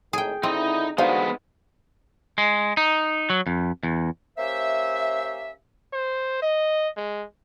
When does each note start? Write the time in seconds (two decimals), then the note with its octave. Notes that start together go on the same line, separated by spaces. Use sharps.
0.13 G#1 A2 D#3 G#4 G5
0.43 G#1 D3 C4 D#4 E4 D#5
0.98 G2 D3 G#3 B3 D#4 F#4 C5 F5
2.38 G#3
2.77 D#4
3.30 F#3
3.47 F2
3.83 E2
4.38 A#3 C#4 G4 C5 E5
5.93 C5
6.42 D#5
6.97 G#3